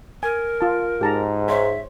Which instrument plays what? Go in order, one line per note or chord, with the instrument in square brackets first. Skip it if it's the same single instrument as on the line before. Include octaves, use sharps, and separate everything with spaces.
[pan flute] A#4 [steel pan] G#5
[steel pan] F4 A5
[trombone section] G#2 [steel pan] G4 A5 A#5
[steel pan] C5 C#5 [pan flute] E5